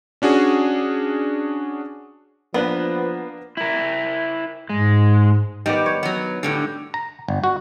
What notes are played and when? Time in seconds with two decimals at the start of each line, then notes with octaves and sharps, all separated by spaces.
0.22 C#4 D4 F#4 G#4
2.54 F3 A#3 B3 D4 B4
3.57 E4 A#4
4.70 G#2 G#3
5.66 D#3 G3 B3 D5
5.86 C#5
6.03 F#3 B3
6.43 A2 D3 G3
6.94 A#5
7.28 G1
7.44 F#4